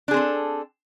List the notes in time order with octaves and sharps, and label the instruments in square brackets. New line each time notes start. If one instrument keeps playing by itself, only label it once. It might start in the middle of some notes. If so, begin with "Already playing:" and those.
[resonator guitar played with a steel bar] D4
G#4
C4
A4